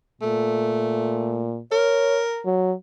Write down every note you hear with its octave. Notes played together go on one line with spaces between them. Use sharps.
A#2 A3
A#4 C#5
F#3